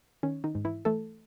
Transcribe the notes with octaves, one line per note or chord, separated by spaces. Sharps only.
D#3 C#4
D#3 D#4
G#2
E3 E4
E3 A3 A4